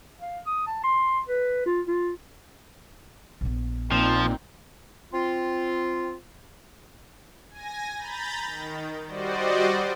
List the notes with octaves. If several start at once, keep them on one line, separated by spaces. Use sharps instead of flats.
F5
D#6
A5
C6
B4
F4
F4
A#1 B3
A#2 F3 C4 D#4
C4 F4
G#5 A#6
A#5 B5 G6 A6
D#3
G3 F#4 C5 D5 D#5